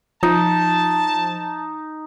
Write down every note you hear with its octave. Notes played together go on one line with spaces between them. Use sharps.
F3 D#4 A5